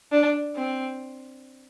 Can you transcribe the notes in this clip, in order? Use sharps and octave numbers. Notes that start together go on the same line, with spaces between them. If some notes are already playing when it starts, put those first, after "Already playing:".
D4
C4